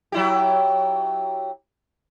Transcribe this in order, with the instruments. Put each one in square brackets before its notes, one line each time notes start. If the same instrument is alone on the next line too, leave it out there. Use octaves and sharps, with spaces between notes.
[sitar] F#3 E4 G4